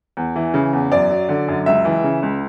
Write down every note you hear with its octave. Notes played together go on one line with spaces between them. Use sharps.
E2
E3
C#3
E2
F#2 D5
F#3
D3
F#2
C#2 E5
E3
C#3
C#2